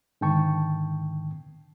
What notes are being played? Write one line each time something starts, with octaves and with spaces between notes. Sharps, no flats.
G#2 D3 D#3 G5 A5 C#6